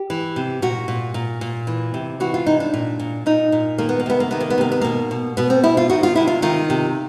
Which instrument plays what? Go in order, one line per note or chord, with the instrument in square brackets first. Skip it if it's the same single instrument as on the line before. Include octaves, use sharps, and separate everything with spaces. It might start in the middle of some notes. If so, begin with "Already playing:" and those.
Already playing: [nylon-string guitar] G4
E3
C3
A#2 F#4
A#2
A#2
A#2
E3
C3
E3 F#4
F4
C3 D#4
D4
A#2
A#2
A#2 D#4
A#2
D#3 A#3
B3
A#3
C3 B3
A#3
D#3 B3
A#3
B3
C3 A#3
B3
B2 A#3
B2
B2 B3
C4
B2 E4
F4
D#3 F#4
F4
C3 E4
F4
D#3 F4
C3